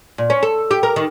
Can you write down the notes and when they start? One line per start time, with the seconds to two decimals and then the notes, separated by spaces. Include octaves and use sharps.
0.18 A#2
0.30 C#4
0.43 A4
0.71 G4
0.83 A#4
0.96 D#3